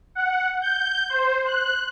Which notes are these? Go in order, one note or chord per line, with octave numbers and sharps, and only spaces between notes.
F#5
G6
C5
F#6